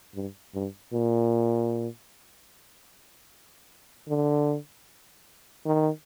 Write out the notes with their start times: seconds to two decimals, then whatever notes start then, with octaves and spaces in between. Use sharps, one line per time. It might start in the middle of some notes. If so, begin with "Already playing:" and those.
0.15 G2
0.55 G2
0.93 A#2
4.09 D3
5.66 D#3